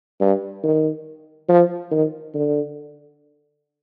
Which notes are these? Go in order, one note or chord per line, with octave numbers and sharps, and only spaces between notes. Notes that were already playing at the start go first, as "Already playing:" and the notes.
G2
D#3
F3
D#3
D3